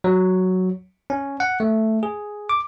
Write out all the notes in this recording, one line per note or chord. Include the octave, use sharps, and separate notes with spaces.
F#3
C#4
F#5
A3
G#4
D6